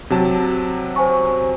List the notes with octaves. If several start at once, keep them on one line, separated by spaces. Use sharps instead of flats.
C3 F#3 A5
C5 G#5 C#6